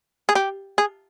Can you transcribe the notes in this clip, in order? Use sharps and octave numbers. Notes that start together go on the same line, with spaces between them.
G#4
G4
G#4